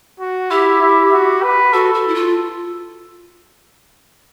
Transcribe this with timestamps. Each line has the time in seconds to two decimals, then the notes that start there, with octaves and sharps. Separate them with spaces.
0.20 F#4
0.50 E4 G4
0.81 E4
1.12 F#4
1.43 B4
1.73 F#4 A4
1.94 F#4
2.08 E4
2.14 F4